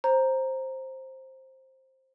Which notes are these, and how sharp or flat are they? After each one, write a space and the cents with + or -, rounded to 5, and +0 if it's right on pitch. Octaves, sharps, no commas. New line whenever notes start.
C5 +10 A#5 +0